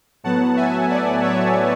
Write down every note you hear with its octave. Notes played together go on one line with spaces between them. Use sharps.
A2 F#3 B3 F#5 A5
E5 G#5
D5 F#5
C#5 E5